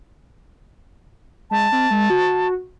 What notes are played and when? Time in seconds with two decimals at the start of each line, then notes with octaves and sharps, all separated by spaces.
1.51 G#3 A5
1.72 C4
1.91 G#3
2.10 F#4